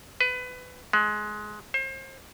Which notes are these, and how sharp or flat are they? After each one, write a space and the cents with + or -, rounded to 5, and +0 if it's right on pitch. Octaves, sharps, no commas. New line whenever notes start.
B4 +20
G#3 +20
C5 +35